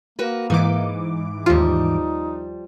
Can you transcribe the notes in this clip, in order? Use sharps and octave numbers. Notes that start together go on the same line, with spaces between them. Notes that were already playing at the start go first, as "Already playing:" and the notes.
A#3 F#4 A#4 B4
G#2 E3 D#4 D6
D#2 F3 G3 D#4 F4